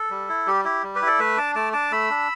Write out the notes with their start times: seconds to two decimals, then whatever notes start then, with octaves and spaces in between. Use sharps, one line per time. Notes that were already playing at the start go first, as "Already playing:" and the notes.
Already playing: A4
0.11 G3
0.29 E4
0.47 G3 G4
0.64 E4 G4
0.83 G3
0.95 G4 B4
1.02 E4
1.07 A4 D5
1.19 A3 B4 E5
1.37 D4 A5 D6
1.55 A3 A5 D6
1.73 D4 A5 D6
1.92 A3 B5 E6
2.10 D4